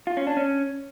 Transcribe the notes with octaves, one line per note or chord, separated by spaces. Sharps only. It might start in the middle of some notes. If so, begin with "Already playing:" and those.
F4
C#4
D4
C#4